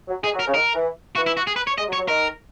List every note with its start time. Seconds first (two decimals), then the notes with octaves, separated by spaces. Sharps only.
0.08 F#3
0.24 G#3 G#4
0.34 F#3
0.39 A#4
0.48 C#3
0.54 D#3 A#4
0.74 E3
1.15 E3 F#4
1.26 E4
1.37 F#4
1.47 G#4
1.56 B4
1.67 C#5
1.78 G#3 D#5
1.87 F#3
1.93 C#5
1.97 F#3
2.08 D#3 A#4